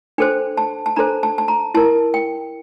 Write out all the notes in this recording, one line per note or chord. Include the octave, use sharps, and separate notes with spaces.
D4 A4 C5 G5
A5
A5
D4 A4 C5 A#5
A5
A5
A#5
E4 A#4 A5
G5